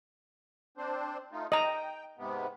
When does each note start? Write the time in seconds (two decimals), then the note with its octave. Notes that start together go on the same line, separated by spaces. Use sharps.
0.77 C4 D4 C5
1.32 A3 D#4 F4
1.52 D#5 G5 A#5
2.18 G#2 C3 B3